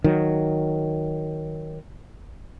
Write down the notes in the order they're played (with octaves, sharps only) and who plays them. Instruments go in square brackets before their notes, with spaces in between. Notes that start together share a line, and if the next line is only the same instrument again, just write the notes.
[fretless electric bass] D#3 F#3